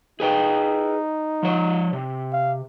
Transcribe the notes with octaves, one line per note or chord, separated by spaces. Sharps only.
D#4 G#4 B4 G5
F3 C#5
C3
F5